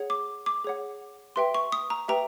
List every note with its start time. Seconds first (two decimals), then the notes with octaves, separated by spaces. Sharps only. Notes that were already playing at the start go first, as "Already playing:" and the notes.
Already playing: G#4 C#5 F#5
0.10 D6
0.46 D6
0.64 G#4 C#5 F#5
1.36 G4 B4 E5 G5 C6
1.54 C#6
1.72 D#6
1.90 A#5
2.08 G4 B4 E5 G5 A#5